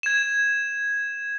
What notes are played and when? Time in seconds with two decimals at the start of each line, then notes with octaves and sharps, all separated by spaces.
0.03 G#6 E7